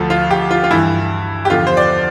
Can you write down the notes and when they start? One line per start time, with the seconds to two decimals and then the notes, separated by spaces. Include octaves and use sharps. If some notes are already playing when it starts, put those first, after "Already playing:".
Already playing: D2 D3 F3 A4
0.10 F4
0.31 G4
0.51 F4
0.64 F4
0.71 G2 E3 E4
1.45 G4
1.50 E2 D3 F3 F4
1.67 C5
1.77 D5